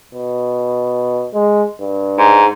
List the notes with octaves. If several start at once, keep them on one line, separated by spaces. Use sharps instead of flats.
B2
G#3
G2
G#2